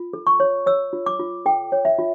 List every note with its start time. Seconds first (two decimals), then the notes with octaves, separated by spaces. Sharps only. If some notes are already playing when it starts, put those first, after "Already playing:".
Already playing: F4
0.13 A4
0.27 C#6
0.40 C#5
0.66 C#5 E6
0.93 F4
1.06 D6
1.19 F4
1.46 A4 G5
1.72 C#5
1.85 E5
1.99 F4